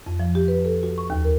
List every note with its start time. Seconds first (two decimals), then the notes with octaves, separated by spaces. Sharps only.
0.06 F2
0.20 F3
0.35 G4
0.48 B4
0.65 A4
0.83 F#4
0.98 C#6
1.10 D#2
1.25 A#4